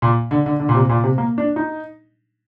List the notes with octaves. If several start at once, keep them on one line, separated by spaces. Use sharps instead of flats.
A#2
D3
D3
D3
A#2
C3
A#2
C3
A#3
D4
D#4